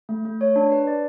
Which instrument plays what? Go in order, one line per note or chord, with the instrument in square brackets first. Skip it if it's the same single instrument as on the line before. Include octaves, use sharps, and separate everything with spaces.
[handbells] A3
A3
C#5
D4
B4
D5